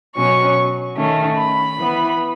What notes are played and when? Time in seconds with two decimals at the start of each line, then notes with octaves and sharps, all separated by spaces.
0.16 B2 F#3 C#4 C#6
0.97 D#3 A3 C#4
1.38 B5
1.79 E3 B3